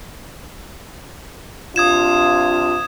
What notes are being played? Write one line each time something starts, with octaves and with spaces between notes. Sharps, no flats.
C3 D4 F4 D#6 G#6 E7